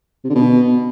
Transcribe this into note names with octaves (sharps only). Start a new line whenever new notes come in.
C3
D3
B2